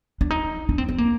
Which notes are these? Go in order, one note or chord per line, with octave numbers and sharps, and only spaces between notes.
D4
D#4
D4
C4
C4
A#3